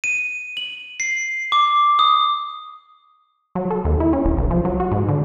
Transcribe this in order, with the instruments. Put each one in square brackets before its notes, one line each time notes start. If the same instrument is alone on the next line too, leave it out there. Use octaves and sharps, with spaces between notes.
[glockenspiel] D#7
F#7
C7
D6
D#6
[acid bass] F#3
A4
D#2
E4
C#4
D1
B1
F3
F#3
F#4
G#2
D3